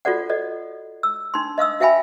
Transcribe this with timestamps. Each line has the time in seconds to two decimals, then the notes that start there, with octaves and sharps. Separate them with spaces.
0.05 F4 F#4 A4 D5 F#5
0.29 A4 D5 D#5
1.03 E6
1.34 D4 D#4 C6
1.58 D#5 F5 D#6 E6
1.80 F#4 E5 F5 G5 G#5 B5